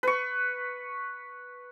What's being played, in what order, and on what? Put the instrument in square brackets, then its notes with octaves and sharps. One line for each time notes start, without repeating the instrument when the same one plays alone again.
[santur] B4 C#6